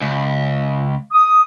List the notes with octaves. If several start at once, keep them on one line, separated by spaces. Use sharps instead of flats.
C#2
D#6